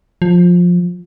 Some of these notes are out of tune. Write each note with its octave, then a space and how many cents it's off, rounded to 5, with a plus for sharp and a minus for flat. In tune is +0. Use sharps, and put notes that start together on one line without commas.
F3 +15